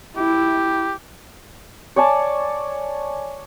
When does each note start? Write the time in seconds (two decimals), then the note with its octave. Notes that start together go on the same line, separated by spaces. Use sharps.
0.17 E4 G4
1.96 C#5 D5 G#5 A5